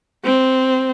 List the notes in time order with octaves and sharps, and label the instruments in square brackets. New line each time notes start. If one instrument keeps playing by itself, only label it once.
[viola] C4